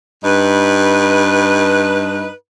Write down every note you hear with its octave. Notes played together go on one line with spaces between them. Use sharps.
G2 D#4 B4